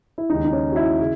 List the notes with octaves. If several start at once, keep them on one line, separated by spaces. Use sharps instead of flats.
E4
D#2 C#3 G#3 D#4
D#4
C#4
F#4
E4
C#3